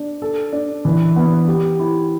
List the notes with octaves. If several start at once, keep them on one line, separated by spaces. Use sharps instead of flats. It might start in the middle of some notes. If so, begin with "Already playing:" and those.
Already playing: D4
A4
D4
E3
B3
G4
E4